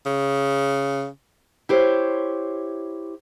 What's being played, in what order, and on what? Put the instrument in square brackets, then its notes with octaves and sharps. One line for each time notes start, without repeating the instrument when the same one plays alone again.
[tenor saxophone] C#3
[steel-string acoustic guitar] E4 G4 C5 C#5